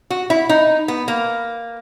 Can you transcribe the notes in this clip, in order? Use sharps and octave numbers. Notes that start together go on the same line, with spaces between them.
F#4
E4
D#4
B3
A#3